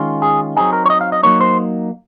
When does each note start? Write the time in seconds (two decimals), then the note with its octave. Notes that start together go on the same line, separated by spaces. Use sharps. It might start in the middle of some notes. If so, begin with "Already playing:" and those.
Already playing: D#3 G#3 C#4 F4
0.22 G#4
0.56 F#3 C4 D#4 G#4
0.73 A#4
0.86 C#5
0.90 D#5
1.01 F5
1.12 D#5
1.23 F#3 A#3 D#4 C#5
1.41 C5